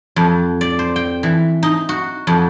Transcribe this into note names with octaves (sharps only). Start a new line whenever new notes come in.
F2
D5
C5
G5
E3
D#4
F#4
F2